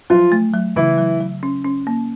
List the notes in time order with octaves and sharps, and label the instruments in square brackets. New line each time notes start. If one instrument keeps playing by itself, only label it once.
[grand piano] F3 F4 [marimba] F#3
[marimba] A3
F#3
[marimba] C#3 [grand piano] E3 E4
[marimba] F#3
F#3
C#4
C#4
A#3